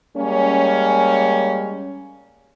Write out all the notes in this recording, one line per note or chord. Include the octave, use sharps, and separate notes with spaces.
G3 G#3 A#3 C#4